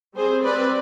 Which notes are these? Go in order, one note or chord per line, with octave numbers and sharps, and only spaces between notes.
G3 C4 G#4 C5
G3 C4 B4 D5